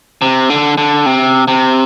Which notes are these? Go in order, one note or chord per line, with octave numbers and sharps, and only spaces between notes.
C3
D3
D3
C3
C3